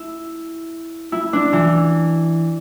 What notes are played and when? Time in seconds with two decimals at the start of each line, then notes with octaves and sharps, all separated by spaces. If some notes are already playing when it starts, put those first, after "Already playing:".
Already playing: E4
1.12 E4
1.33 D4
1.53 E3